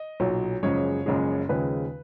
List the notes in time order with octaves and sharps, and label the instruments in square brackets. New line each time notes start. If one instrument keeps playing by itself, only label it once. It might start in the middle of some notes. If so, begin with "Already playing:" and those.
Already playing: [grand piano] D#5
B1 A#2 F#3
F#1 F#2 C#3 F3 G#3 C#5
F#1 F#2 C#3 F3 G#3
D#2 C#3 F3 G#3 B4